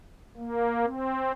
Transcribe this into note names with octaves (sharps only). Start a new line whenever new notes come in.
A#3
C4